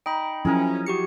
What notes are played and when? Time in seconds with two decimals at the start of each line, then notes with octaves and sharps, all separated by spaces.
0.06 D#4 G5 B5
0.45 F3 F#3 C#4 E4 G#4 A#4
0.86 F#4 G4 C#7